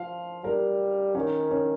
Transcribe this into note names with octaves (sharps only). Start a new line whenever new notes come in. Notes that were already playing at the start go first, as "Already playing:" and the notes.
Already playing: F3 F5
G3 A#4
D#3 C#4
C#4